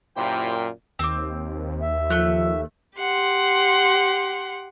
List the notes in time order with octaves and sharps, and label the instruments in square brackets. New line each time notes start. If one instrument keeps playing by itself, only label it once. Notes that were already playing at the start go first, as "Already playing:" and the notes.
[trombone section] F#2 A#2 [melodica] E4 G4 C5 [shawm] G5
[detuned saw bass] D#2 [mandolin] C4 D6
[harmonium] E5
[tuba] F3 [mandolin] A3 F#6
[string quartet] G4 F#5 C6